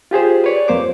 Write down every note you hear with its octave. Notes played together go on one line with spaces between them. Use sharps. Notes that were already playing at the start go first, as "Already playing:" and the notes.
F4 G4 G#4 C5
B4 C#5 D5
F2 A#3 C5 D6